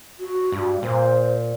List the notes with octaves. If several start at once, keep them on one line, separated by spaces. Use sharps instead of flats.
F#4
G2
A#2 C5